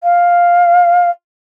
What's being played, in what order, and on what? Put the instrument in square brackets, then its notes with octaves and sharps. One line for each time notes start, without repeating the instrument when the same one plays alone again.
[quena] F5